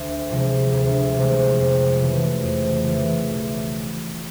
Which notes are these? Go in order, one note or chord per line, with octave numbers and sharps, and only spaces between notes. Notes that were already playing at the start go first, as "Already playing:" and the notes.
Already playing: D2
C3 F3 G#3
D2
C3 F3 G#3
F2
C#3 E3 A3
F2
C#3 E3 A3
B1